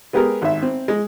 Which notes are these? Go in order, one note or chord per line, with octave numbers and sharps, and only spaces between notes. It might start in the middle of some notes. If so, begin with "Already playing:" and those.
G#3 B3 G4 G#4 A#4
G#1 E5
C4
G#3